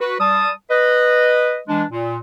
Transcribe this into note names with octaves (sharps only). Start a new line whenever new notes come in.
F#4 B4
G3 A5 D#6
B4 D#5
E3 G#3 D4
A#2